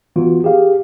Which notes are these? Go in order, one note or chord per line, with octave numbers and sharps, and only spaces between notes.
E3 B3 F4 F#4
G4 G#4 F5